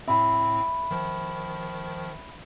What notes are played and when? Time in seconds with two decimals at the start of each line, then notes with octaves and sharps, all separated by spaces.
0.08 A2 C4 E5 B5
0.91 D#3 F3